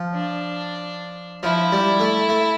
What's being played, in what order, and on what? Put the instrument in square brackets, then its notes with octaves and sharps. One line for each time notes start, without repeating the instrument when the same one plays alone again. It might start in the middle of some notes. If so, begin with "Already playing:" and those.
Already playing: [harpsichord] F3
[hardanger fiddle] D4
[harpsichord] F3 [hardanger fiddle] E4
[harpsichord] G3
A3
A3